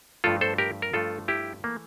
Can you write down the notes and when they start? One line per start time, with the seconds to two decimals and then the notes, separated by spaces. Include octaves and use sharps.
0.24 G2 F3 A3 F4 A4
0.41 A4 C5
0.58 G4 A#4
0.82 A#4
0.93 G2 F3 A3 F4 A4
1.28 E4 G4
1.64 E3 A3 A#3